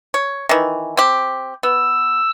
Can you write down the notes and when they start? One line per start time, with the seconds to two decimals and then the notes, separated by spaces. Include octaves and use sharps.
0.14 C#5
0.49 D#3 E3
0.97 C4 G4
1.63 B3 E6